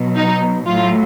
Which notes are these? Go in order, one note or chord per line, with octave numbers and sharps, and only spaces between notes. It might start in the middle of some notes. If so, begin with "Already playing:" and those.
Already playing: B2 F#3
D#4
A2 F#3 F4